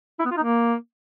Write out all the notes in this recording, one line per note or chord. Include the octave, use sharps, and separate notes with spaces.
E4
B3
F4
D#4
A#3